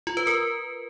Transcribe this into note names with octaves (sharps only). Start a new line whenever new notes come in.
F4
B4
A#4